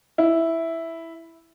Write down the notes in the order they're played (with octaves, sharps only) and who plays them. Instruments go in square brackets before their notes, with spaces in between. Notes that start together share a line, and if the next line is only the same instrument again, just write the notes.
[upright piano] E4